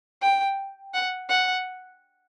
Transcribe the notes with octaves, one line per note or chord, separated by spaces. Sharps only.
G5
F#5
F#5